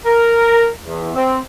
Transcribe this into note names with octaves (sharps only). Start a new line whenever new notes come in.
A#4
E2
C4